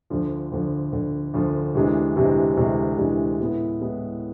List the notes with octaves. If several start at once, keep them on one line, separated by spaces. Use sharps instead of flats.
D2 D3 F3
D2 D3 F3
D2 D3 F3
D2 D3 F3
D2 C3 E3 G#3 D4
D2 C3 E3 G#3 D4
D2 C3 E3 G#3 D4
D2 C3 E3 G#3 D4
A2 G#3 B3 E4
A2 G#3 B3 E4